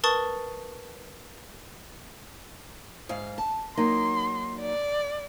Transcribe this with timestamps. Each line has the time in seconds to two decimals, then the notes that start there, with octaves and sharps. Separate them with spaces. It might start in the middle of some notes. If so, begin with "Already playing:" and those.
0.04 A#4 B4 A5 C#6 D#6 A6
3.09 G#2 F5
3.38 A5
3.77 F#3 A#3 D#4 C6
4.60 D5